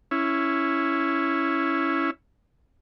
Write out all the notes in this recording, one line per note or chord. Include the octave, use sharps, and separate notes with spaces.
C#4 E4